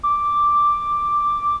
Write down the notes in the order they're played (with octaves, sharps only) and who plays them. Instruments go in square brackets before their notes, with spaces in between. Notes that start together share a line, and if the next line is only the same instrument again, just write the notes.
[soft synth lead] D6